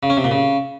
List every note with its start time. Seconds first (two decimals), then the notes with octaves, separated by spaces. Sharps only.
0.03 C#3
0.10 C#4
0.17 C3
0.24 A#2
0.32 C#3